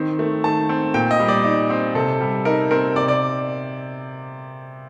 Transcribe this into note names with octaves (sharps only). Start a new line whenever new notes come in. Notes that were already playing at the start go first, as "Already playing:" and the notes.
Already playing: D#3 C4
A3
D#3 A5
C4
A#2 G5
D#5
G3
D5
D#4
C4
C3 A4
G3
D#4 A#4
C4 A#4
C3 D5
D5